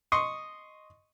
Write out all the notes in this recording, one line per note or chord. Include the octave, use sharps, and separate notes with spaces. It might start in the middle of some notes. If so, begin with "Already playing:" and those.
D#5 C6 C#6 D#6